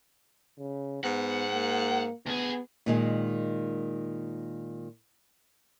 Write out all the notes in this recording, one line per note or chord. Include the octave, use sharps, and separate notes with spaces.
C#3
G#2 B3 F#5
A#3
D2 B3 G#4
A#2 D#3 G#3